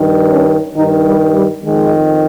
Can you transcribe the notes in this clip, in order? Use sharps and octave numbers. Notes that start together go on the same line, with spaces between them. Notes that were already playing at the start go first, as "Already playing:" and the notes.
Already playing: G2 D#3
C#4
G2 D#3 D#4
G3
G3
F2 D#3 G#3